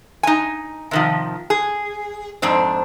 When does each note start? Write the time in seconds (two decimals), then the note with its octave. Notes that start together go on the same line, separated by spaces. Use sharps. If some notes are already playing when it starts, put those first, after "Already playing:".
0.23 D#4 G#5
0.91 C3 D#3 F3
1.50 G#4
2.42 F2 G#2 C4 D4